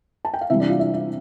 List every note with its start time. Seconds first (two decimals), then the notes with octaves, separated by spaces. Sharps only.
0.25 A5
0.34 G5
0.41 F5
0.50 C3 E3 G3 E4 E5
0.60 D4 D5
0.69 F4 F5
0.79 E4 E5
0.94 E4 E5